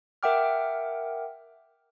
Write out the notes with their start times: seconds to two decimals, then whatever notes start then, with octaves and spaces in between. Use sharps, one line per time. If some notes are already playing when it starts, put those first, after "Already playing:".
0.23 A#4 E5 F#5 G5 D6 F6